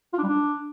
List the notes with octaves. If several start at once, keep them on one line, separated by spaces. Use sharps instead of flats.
F4
D4
G3
D4